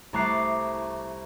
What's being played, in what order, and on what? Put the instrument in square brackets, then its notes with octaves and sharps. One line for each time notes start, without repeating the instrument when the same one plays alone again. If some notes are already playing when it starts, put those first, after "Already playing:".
[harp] C2 A3 A#5 D6 F#6 C7